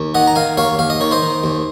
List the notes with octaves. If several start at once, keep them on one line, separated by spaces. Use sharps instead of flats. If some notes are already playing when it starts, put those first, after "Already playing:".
Already playing: D#2
D#3 D#5 F#5
A#5
D#3 F5 G#5
D#2 C#5 F5
D#2 F5
D#5
D#3 C#5
C5 D#5
D#3
D#2